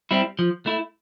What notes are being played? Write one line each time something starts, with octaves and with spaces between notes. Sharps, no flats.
G3 C4 E4
F3
A3 E4